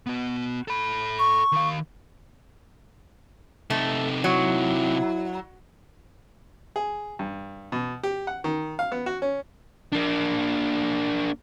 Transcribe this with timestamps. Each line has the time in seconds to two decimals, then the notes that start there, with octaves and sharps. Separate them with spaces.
0.07 B3 F#4
0.68 A4 B5
1.19 C#6
1.52 D#3 F5
3.70 C3 A3 D#4
4.24 F#3 E4
6.76 G#4
7.19 G2
7.72 B2
8.03 G4
8.27 F#5
8.44 D#3
8.79 F5
8.92 B3
9.06 F#4
9.22 C#4
9.92 A#3 D4